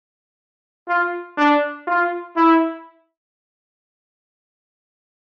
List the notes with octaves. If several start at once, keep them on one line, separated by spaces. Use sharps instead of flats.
F4
D4
F4
E4